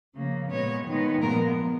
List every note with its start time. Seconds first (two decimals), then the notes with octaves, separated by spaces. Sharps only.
0.15 C#3 F3 A#3
0.50 A#2 G#3 B3 C#5
0.86 D#3 G#3 B3
1.21 A#2 F3 G#3 B3 A#4